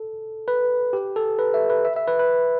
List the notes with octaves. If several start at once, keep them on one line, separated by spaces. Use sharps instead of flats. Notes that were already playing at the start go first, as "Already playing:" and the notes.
Already playing: A4
B4
G4
A4
B4
E5
B4
E5
E5
B4
B4